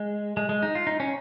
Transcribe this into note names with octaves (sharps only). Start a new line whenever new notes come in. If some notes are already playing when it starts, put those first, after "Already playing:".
Already playing: G#3
G#3
G#3
D#4
F4
D#4
C#4